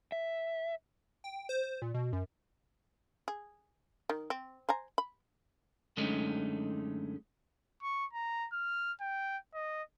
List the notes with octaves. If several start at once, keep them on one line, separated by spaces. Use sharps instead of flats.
E5
G5
C5
C5
A#2
B2
F#2
G#4
D#3
C4
C5 G#5 A#5
B5
F#2 D3 G#3 A3 C#4 D#4
C#6
A#5
F6
G5
D#5